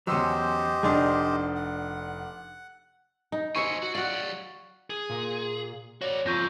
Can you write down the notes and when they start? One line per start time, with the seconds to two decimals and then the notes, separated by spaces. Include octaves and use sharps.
0.07 E2 F#3 C#4 G4 C5 D#5 C6 E6
0.83 F1 D4 D#4 G#4 D5 C6
1.56 F#5
3.32 D#4
3.56 F#3 E4 C5 C#5 D#5 G#5 C#6 C#7
3.83 F#4
3.95 F#3 F#4 D5 F5
4.90 G#4
5.10 A#2 A#4
6.01 F#4 C#5 D5
6.26 F2 B3 F4 C#6 G6 A#6